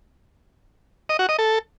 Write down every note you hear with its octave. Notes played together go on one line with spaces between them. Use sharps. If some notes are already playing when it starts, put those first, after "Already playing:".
D#5
F#4
D#5
A4